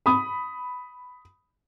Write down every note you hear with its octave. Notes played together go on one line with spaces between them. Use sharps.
B5 D#6